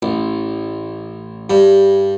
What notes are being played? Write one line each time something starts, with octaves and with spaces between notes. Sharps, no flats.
A1
G2